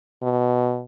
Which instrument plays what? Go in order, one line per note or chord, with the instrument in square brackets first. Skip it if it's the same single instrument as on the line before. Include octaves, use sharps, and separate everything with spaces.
[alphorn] B2